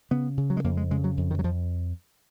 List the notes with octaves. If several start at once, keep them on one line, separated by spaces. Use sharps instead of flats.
C#3 B3
C#3
F#3
G#3
F2 A#3
G#3
C#3 G#3
F#3
F2
D#3
F#3
F2 F3